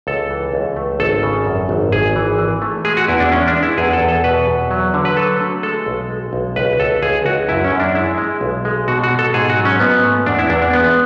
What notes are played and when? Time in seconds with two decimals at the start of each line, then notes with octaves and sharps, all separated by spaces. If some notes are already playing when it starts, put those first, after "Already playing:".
0.07 C#2 A4
0.30 E3
0.54 C#2
0.77 A3
1.00 G#1 A4
1.23 C#3
1.46 F#2
1.69 G#1
1.92 G#1 G#4
2.16 E3
2.39 E3
2.62 A3
2.85 G#3 G#4
2.97 F#4
3.08 E2 E4
3.20 D4
3.32 G#3 C#4
3.48 D4
3.55 G#3
3.63 E4
3.77 E2 G#4
3.93 A4
4.01 E2
4.09 A4
4.24 B2 B4
4.47 E2
4.71 F#3
4.94 D3
5.05 B4
5.16 F#3 A4
5.40 A3
5.63 G#3 A4
5.86 B1
6.10 G#3
6.33 B1
6.56 C#2 B4
6.79 C#2 A4
7.03 C#2 G#4
7.25 C#2 F#4
7.49 F#2 E4
7.64 C#4
7.72 F#2
7.80 D4
7.95 G#3 E4
8.18 G#3
8.41 B1
8.65 G#3
8.88 B2 F#4
9.04 F#4
9.11 B2
9.19 A4
9.34 G#2 G#4
9.50 F#4
9.57 F#3
9.65 C#4
9.80 G#2 B3
10.03 A3
10.26 E2 D4
10.39 E4
10.50 E2 D4
10.62 D4
10.73 G#3 B3